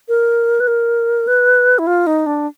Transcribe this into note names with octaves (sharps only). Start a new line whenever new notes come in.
A#4
B4
A#4
B4
E4
F4
D#4
D4